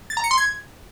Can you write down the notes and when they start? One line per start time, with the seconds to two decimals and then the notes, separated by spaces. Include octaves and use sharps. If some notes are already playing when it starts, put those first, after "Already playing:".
0.10 A6
0.17 A#5
0.24 C#7
0.31 C6
0.38 G#6